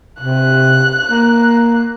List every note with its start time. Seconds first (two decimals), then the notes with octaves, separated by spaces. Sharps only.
0.21 C3 F#6
1.10 A#3